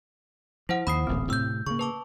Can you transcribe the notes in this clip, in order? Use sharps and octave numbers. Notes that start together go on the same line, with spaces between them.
F3 E4 C5 F#5
D#2 B5 D#6 C7
D1 A1 A#2 C4
A2 C3 E6 G6
C#3 A#3 C#6
B4 A5 D6